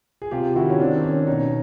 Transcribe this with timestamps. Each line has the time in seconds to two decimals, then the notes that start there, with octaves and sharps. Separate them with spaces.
0.22 G#4
0.31 C3 F4 G4
0.55 D#3 E4 F#4
0.70 C#4
0.80 D#3 C4 D4
1.03 D#3 C#4
1.18 D4
1.27 B2 C#4 D#4